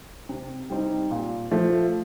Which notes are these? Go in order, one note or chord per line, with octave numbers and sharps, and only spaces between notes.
C3
G3 C4 D#4
A#2
F3 A3